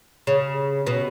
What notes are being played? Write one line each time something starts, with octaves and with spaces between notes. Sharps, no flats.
C#3
B2